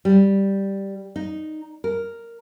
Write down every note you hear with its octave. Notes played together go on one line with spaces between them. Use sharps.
G3
D#4
A#4